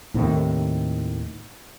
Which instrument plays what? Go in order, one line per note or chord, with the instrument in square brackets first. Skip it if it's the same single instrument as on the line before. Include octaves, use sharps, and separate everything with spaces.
[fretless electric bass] D#2 A2 C3 D#3